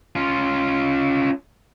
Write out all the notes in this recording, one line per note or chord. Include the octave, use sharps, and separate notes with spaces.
C#4 F4